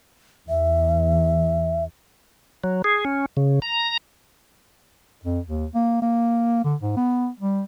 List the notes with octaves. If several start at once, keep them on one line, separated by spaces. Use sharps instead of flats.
E2 E5
F#3
G#4
C#4
C#3
A#5
F2
D#2
A#3
A#3
D3
G#2
B3
G3